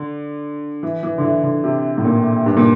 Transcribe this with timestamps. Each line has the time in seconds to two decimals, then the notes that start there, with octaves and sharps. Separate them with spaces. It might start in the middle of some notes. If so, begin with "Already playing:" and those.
Already playing: D3
0.83 E3
1.03 E3
1.18 D3
1.24 E3
1.44 D3
1.64 C3
1.98 A2
2.05 A#2
2.46 G2
2.57 A#2